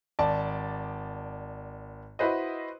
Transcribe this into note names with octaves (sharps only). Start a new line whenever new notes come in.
G#1 D5 A5
E4 F#4 B4 C5 D#5